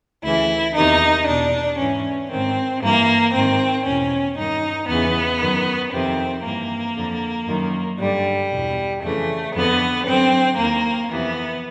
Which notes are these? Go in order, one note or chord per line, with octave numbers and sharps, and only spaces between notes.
D2 C#3 E3 E4
E2 C3 D#3 D#4
E2 B2 D4
G#2 E3 C#4
G#2 D#3 C4
G2 E3 A#3
G#2 D#3 C4
E2 B2 C#4
G2 D#3 D#4
E2 C#3 E3 B3
F#2 D#3
F2 C3 D#3 C4
G2 E3 A#3
F2 D3
F#2 D#3
G2 D3 G3
E2 B2
F2 C#3 E3 A3
F2 D3 B3
F#2 D3 C4
D#2 D#3 A#3
F2 C3 E3 B3